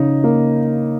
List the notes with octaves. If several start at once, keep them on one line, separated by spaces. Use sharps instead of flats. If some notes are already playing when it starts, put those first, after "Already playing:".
Already playing: C#3 D#4
A#3